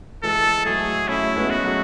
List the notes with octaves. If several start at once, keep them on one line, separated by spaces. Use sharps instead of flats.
E3 G#3 A4
F#3 A3 G#4
A3 C#4 E4
G#3 B3
F#4
F#3 A3